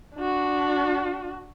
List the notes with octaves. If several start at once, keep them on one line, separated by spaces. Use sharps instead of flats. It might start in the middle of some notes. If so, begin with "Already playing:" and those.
D4 F#4